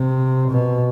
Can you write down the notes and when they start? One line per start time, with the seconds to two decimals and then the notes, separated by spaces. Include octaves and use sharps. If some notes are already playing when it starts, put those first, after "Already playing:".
Already playing: C3
0.50 B2